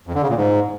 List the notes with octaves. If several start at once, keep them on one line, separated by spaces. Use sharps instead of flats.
F2
D3
C#3
A#2
G#2